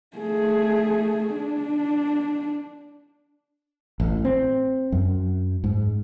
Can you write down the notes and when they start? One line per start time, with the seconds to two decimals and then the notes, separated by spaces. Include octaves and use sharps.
0.17 A3 G#4
1.36 D4
4.00 A1
4.25 C4
4.92 F#2
5.64 G#2